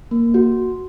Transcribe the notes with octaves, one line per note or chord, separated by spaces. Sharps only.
A#3
F#4